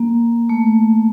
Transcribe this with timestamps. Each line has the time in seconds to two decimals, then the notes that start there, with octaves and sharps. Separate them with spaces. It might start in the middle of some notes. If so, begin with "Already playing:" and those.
Already playing: A#3
0.49 A3